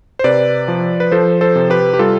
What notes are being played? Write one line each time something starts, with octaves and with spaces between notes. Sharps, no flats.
C5
C3 B4 D5
F3
B4
F3 A4 C5
A4 C5
C3
G4 B4
G4
G3 F4 A4